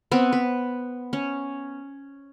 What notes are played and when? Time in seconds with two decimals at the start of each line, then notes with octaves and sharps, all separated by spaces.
0.12 B3 C4
0.32 B4
1.13 C#4